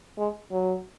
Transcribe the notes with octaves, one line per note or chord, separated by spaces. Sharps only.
G#3
F#3